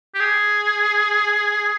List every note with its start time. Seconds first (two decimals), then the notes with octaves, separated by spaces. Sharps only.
0.15 G4
0.20 G#4